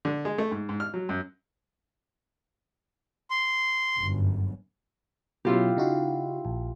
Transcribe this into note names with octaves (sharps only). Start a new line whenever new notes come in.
D3
G#3
A3
G#2
G#2
F6
F#3
F#2
C6
G1 F#2
B2 F#3 C#4 E4 F4 G4
C#3 D#4 F#4
A#1